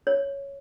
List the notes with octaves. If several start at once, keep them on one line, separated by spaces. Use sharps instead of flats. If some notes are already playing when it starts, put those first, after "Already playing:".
C#5